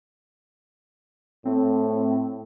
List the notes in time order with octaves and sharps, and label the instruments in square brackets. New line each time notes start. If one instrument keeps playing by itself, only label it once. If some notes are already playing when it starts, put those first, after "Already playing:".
[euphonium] A2 [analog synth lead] C4